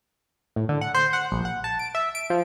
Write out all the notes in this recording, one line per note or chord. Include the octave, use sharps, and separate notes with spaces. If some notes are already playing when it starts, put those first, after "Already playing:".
A2
D3
F#5
C5
F#5
A#1
F#5
A5
D7
E5
D7
F3